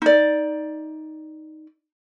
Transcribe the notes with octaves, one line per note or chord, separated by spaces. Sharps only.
D#4 D5